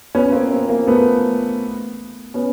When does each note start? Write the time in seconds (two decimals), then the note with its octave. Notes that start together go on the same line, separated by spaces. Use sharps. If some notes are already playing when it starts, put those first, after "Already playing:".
0.15 B3 C#4
0.32 A#3 C4
0.51 A#3 C4
0.69 A#3 C4
0.87 A3 B3
2.34 B3 C#4